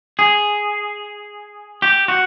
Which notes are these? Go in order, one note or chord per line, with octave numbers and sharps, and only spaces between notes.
G#4
G4
F#4